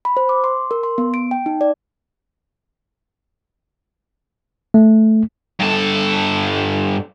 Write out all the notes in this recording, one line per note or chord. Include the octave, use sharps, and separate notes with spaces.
B5
C5
D6
C6
A#4
C6
B3
D7
G5
D#4
D5
A3
G2 A4